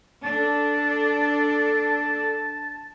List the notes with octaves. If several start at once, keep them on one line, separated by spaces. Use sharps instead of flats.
D4 A4 A5